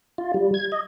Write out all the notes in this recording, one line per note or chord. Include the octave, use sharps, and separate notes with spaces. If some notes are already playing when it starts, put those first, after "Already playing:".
F4
G3
G#6
D#5